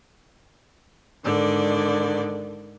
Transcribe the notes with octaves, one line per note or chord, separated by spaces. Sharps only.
G#2 D3 D#3 D5